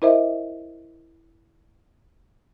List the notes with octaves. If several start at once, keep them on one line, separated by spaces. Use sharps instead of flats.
E4 A#4 C5 D#5 E5